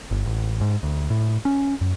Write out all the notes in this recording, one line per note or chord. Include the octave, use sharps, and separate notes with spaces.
G1
A1
G#2
D2
A2
C#4
F#2